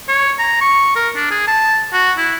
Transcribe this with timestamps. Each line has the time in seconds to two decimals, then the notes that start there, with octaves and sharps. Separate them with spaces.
0.08 C#5
0.39 A#5
0.61 C#6
0.95 A#4
1.15 D4
1.31 G#4
1.48 A5
1.93 F#4
2.17 E4